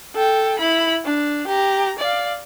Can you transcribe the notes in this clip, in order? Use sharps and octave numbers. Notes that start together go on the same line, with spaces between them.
A4 G5
E4 B5
D4
G4 A#5
D5 F5